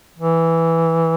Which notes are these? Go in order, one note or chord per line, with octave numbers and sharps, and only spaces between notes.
E3